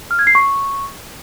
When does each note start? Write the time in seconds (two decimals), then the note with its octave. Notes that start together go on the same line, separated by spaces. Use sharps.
0.11 F6
0.19 G#6
0.27 C7
0.35 C#6